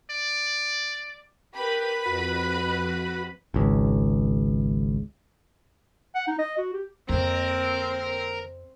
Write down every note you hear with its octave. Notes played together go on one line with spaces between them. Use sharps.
D5
G4 A#4 B4 B5
F2 F#4 F#6
G#1 C#2
F#5
D#4
D#5
F#4
G4
F2 D3 A#3 C4 A#4